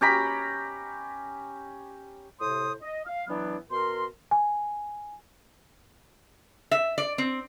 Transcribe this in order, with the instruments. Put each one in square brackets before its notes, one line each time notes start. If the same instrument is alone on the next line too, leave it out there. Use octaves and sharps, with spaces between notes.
[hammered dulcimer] C#4 G4 A#5 B5
[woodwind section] A2 C3 C5 D#6
D#5
F5
E3 F#3 B3 D4
B2 A#4 C6
[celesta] G#5
[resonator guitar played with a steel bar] E5
D5
C4